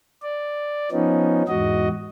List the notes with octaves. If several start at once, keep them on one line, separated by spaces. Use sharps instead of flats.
D5
F3 B3 C#4 D#4
E2 G#2 F#4 D#5